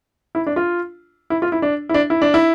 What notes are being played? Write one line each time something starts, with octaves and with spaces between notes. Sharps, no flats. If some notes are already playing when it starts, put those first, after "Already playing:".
E4
D4
F4
E4
F4
E4
D4
E4
D4
E4
D4
E4